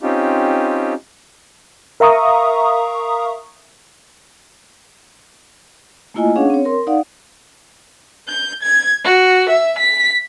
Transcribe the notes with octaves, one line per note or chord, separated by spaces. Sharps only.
C4 C#4 D#4 F4 G4
A#4 E5 F5 A#5 C#6 D#6
A3 A#3 E4 F4 D#5 G#5
C#4 D4 G#4 C#5 F5 F#5
C4 C#5
A#4 C6
D#4 D5 F5 F#5
G6
G#6
F#4
E5
B6